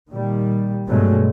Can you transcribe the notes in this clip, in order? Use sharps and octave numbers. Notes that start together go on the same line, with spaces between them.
A#2 D#3 G3
G2 B2 F#3 G#3 A3